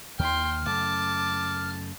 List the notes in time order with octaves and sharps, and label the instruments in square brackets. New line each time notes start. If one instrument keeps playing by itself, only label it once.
[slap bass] D#2 D#3 [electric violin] G5 C6 [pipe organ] F6
[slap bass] F#2 C#3 A3 [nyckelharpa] A5 [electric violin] D6